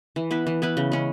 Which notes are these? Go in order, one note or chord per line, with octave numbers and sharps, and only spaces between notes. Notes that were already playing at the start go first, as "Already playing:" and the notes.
E3
B3 E4 B4
E3
B3 E4 B4
C#3
G#3 C#4